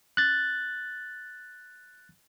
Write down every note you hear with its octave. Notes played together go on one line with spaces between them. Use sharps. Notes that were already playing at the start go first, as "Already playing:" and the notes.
F#6 A6